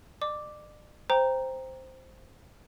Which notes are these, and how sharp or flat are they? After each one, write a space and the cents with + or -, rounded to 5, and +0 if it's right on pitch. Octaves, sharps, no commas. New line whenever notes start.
D5 +40 D6 +0
C5 +0 G5 +15 A#5 +0